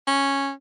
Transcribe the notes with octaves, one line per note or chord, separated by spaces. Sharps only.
C#4